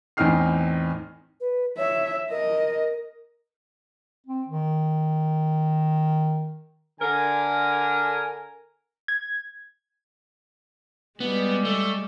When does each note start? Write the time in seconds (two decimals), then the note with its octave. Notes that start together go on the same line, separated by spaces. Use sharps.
0.17 E2 A2 C4 D#4 F6 C7
1.40 B4
1.78 C#5 E5
2.31 A#4 D#5
4.26 C4
4.48 D#3
7.01 D3 A#4 G#5
9.08 G#6
11.20 G3 G#3 B3
11.65 A3